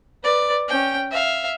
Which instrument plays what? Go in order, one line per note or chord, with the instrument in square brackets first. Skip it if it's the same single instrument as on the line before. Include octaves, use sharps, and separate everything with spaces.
[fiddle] B4 D5
C#4 G5
E5 F5